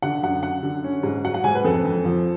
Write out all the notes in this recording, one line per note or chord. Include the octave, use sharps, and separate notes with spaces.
D3 F#5
F#2 F#5
F#2 F#5
D3
C#4
G#2
F#3 F#5
F#5
G#2 G#5
B4
F2 A4
F2
F3